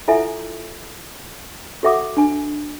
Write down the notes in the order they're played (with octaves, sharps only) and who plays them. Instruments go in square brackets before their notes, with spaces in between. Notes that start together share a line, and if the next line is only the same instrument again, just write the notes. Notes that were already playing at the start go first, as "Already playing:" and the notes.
[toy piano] E4 F4 A4 E5 F#5 G#5
F#4 A4 E5 F#5 D6 D#6
D4 G#5